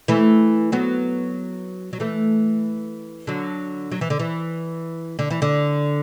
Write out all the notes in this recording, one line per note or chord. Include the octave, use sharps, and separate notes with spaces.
E3 A3
F#3 B3
F#3
E3 A3
D3 F#3
F#3
E3
D3
E3
D3
E3
D3